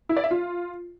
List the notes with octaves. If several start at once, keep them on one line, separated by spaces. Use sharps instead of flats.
E4
D5
E5
F4